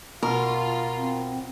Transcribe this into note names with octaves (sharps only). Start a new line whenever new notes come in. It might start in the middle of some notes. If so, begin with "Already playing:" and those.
B2 F4 A#4
C4